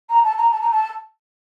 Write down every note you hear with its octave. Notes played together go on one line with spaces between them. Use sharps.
A#5
A5
A#5
A5
A#5
A5